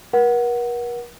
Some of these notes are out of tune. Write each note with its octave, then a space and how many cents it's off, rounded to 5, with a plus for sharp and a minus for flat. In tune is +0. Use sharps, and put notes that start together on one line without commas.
A#4 +45 F#5 +0